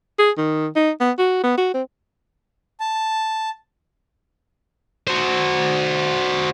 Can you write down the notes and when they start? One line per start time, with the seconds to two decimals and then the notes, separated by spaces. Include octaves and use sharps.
0.19 G#4
0.38 D#3
0.76 D#4
1.00 B3
1.19 F#4
1.44 B3
1.58 F#4
1.74 C4
2.80 A5
5.07 F#4 C5